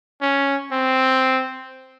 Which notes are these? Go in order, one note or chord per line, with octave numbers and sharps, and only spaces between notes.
C#4
C4